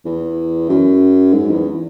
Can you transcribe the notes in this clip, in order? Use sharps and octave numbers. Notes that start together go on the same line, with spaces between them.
E2
F#2
G#2
E2